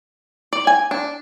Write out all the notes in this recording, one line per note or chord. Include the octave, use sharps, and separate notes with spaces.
D5
G#5
D4